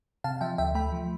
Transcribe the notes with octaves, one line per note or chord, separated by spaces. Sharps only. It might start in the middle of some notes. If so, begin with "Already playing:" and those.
C3 F5 A5
F3 E5 G5
D2 E5 G5
A3 G5 B5
F3